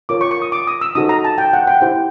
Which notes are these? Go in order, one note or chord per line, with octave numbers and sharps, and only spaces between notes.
F4 A#4 C#5 D6
C#6
C#6
D#6
D6
D#6
E6
D#4 F#4 A4 C5 D#6
A#5
A5
G5
F#5
G5
E4 G4 C5 G5